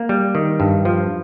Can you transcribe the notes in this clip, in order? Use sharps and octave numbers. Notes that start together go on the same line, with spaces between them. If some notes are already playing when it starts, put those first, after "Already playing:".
Already playing: A#3
G3
D#3
G2
F3